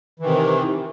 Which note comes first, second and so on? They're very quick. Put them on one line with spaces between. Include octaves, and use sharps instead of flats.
E3 D#3 C3